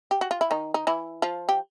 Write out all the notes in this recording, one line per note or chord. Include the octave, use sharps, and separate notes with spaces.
G4
F#4
F4
E4
D#3 D#4
D#4
E3 E4
F3 F4
G4